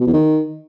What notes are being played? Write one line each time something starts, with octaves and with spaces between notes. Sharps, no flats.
B2
E2
D#3